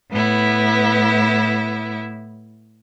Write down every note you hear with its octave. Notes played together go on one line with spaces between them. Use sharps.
A2 B3 E4